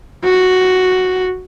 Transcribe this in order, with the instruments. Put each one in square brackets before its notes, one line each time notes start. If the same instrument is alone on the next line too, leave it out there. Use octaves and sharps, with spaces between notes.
[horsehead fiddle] F#4